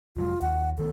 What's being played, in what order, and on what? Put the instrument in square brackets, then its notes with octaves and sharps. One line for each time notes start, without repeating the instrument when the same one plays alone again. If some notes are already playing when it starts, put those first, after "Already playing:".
[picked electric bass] F1 F#3 G#3 [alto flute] F4
[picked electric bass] D#2 [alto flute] F#5
[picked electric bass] D2 D#3 B3 [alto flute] A4